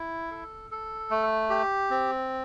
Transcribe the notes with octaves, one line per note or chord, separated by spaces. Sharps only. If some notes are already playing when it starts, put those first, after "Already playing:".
Already playing: E4
A4
A4
A3
G4
C4